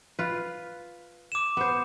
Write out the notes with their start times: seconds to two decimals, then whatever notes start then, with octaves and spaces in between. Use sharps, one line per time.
0.19 F4 B4
1.32 D6 E7
1.57 B3 C5